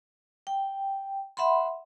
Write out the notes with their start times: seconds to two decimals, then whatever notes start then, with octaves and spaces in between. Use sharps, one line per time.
0.47 G5
1.37 E5 F#5 B5 C6